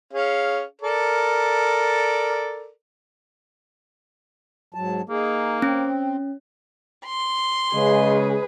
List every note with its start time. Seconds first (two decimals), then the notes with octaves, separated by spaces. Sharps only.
0.13 C#4 G#4 F5
0.82 A4 A#4 D5
4.74 G#2 F#3 A5
5.09 A#3 D#4 G#4
5.62 C4 C#4
7.05 C6
7.74 C#3 G#3 G#4 B4